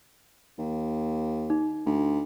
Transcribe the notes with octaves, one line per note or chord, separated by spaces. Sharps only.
D#2
D#4
D2